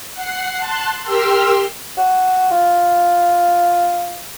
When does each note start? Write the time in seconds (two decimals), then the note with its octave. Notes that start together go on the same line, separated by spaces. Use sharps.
0.14 F#5 C7
0.57 A5 C6 F#6
1.02 G4 A#4 G5 C6 E6 F6
1.97 F#4
2.51 F4